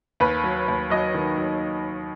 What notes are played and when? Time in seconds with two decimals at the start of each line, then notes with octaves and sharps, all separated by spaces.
0.20 D#2 B4
0.44 F#3
0.68 D#2
0.90 F#3 D#5
1.14 D#3
1.38 F#3